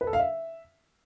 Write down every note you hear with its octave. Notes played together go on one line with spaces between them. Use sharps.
B4
A4
F5
E5